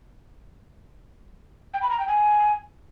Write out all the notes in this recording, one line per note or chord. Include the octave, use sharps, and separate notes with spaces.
G5
B5
A#5
G5
G#5